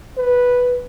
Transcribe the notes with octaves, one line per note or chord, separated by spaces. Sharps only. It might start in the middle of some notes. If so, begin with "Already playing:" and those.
B4